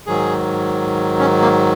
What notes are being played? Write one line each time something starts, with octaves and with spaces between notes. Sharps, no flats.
G#2 D#3 F#3 G#4
C#4
A#3